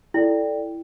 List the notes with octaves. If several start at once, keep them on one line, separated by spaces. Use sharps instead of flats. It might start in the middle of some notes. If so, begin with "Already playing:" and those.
E4 A4 D5 G5